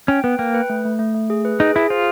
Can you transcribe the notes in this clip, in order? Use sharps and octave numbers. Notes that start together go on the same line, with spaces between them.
C#4 G5
B3 B4
A#3 G5
B4
A3
A3
A3
A3
G#4
B4
D#4 G#4
E4 G#4
F4 C5